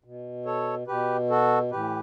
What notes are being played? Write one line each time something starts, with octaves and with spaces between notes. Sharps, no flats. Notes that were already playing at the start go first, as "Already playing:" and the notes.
B2
A4 C#5
B2 G4 B4
F#4 A4
A2 E3 G4 B4